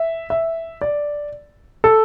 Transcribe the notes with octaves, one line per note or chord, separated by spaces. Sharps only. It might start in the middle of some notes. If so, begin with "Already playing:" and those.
Already playing: E5
E5
D5
A4